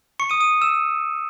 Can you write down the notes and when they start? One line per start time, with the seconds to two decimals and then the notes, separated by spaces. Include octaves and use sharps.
0.20 C#6 C#7
0.30 D#6 D#7
0.40 D#6 D#7
0.62 E6 E7